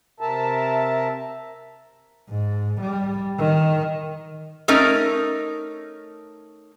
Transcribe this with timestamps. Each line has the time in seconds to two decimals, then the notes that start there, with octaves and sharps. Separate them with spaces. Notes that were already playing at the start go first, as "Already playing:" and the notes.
0.20 C3 A#4 E5 A5
2.29 G#2
2.81 G3
3.38 D#3
4.68 A3 C#4 D#4 A#4